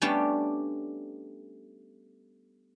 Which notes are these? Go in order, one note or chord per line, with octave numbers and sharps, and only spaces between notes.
G3 A3 B3 C#4 D4 G4